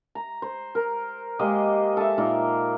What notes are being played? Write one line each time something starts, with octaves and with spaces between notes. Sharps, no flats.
A#5
C5
A#4
G#3 A#3 G4 D#5
A4 E5
A#2 A#3 D#4 A#4